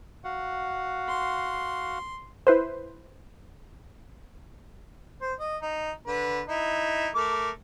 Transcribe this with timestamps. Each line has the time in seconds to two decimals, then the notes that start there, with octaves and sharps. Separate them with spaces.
0.24 F#4 F5 F#5
1.09 C6
2.47 E4 B4 C5
5.21 C5
5.40 D#5
5.62 D#4
6.07 D3 B4
6.48 D#4 E4
7.15 A3 A#4 D6